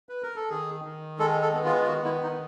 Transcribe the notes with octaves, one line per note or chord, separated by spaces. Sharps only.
B4
A#4
A4
D#3 G#4
D#3
G#3 A4
A4
B3
F4
F4
D#3 F#4
E4
D#3 D#4